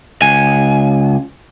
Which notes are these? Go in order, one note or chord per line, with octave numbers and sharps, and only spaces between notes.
C#2 G#5